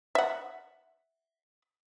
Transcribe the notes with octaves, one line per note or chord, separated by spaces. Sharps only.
E5 F#5